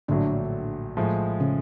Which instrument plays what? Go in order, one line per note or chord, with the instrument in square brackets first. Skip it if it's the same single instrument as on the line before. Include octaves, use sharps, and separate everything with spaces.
[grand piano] A#1 A2 F#3 [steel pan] D3 D4
[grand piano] A2 F3 G#3
[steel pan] C#3 C#4